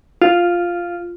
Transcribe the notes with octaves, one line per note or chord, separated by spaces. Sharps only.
F4